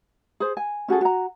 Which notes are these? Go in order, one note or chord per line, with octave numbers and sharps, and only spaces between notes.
G#4 C5
G#5
C#4 F#4 G#4 A4
F#4 A#5